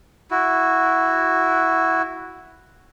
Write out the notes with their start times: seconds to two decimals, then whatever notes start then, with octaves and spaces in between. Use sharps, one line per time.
0.31 E4 F#4